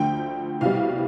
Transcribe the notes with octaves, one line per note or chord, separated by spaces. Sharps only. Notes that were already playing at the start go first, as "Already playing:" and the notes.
Already playing: D2 D3 F3 A3 G5
C2 B2 G3 F5